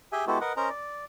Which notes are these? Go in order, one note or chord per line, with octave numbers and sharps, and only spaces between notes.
G4 G#4 E5 G5 G#5
G#3 B3 E4 F#4 G4 A4
A#4 B4 D#5 F#5
C#4 A#4 C5 D#5 A#5
D5